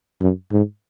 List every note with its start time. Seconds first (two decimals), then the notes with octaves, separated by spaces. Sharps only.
0.21 F#2
0.52 G#2